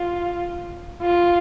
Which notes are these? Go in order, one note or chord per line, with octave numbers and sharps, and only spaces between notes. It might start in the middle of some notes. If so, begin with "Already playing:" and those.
Already playing: F4
F4